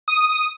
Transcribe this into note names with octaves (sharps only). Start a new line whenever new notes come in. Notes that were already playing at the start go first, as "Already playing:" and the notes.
D#6